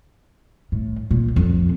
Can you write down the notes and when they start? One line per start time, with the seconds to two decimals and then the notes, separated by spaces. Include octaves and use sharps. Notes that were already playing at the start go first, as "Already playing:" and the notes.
0.72 A2
1.11 A#2
1.36 F2